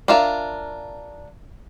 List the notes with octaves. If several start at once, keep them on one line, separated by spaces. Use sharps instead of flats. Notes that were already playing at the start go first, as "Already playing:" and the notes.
D4 F4 A#4 E5 F5